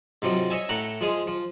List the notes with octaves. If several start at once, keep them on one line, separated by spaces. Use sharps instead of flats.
G#2 C3 F3 F#3
C#5 D#5 E5 G#5
A2 A3 F#5 A#5
F3 G#3 G#4
F3